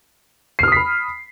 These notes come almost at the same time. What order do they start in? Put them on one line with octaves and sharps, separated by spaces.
C7 F6 D#6 B6 B5